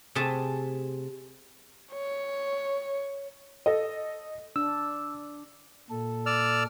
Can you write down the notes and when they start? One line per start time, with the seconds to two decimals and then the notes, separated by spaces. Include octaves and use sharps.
0.15 C3 A3 G#4 E5 A5
1.94 C#5
3.66 A4 D#5
4.56 D4 E6
5.90 A#2 A4
6.26 D5 E6 F6